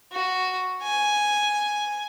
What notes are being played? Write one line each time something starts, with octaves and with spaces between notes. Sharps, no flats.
F#4
G#5